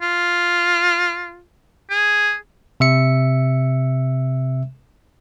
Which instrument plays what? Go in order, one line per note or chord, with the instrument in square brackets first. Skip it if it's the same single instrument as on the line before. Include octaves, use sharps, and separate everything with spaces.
[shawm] F4
G#4
[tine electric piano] C3 E5 C#7